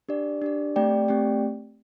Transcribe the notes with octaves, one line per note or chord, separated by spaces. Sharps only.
D4 G4 D5
D4 G4 D5
A3 C4 G4 D5 G5
A3 C4 G4 D5 G5